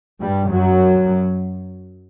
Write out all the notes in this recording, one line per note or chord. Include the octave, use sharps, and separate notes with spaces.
G2 G3
F#2 F#3